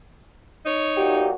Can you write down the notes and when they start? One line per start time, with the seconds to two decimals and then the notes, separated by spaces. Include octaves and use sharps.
0.66 D#4 C#5
0.97 B1 A#2 F#4 G4